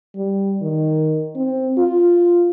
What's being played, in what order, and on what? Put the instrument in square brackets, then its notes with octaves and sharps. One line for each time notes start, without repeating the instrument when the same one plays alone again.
[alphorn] G3
D#3
C4
F4